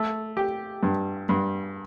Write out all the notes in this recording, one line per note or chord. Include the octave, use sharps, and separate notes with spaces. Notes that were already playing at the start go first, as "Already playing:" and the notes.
Already playing: A3
G4
G2
G2